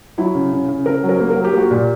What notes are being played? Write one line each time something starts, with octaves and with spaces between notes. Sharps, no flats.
F#3 E4
C#3
C#3
C#3
C#3 A#4
F#3
A#4
A#3
A#4
F#3
G4
A#3 F#4
A#2 G4